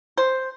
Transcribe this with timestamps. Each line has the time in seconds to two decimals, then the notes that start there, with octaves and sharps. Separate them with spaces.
0.18 C5